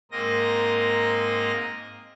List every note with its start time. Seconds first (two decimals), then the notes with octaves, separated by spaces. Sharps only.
0.11 G#2 A#3 C4 A#4 D#5 A#6